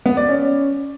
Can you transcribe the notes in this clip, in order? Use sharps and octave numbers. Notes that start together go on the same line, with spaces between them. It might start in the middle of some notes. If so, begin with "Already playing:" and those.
B3
D5
C#4